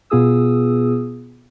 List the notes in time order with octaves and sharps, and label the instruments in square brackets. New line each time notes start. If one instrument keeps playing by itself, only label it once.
[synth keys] B2 B3 F4 G#4 D#6 E6